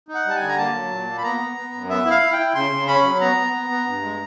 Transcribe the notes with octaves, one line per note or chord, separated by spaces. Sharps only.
D#4
F#5
G3 A5
G#5
D3
A#5
A#3 A5
F#3
A#2
A#3
B5
B3 A#5
B3
B3
F#2
B3 E5
E4
F5
E4
G5
E4
C#3 C6
C#3
C#4 B5
F#3
B3 A#5
B3
B3
B3
G2
G#3